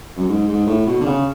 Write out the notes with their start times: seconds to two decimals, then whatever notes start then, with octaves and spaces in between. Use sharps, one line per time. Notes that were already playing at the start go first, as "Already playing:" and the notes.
0.16 F#2
0.28 G#2
0.48 G#2
0.67 A2
0.87 B2
1.01 D3
1.05 C#3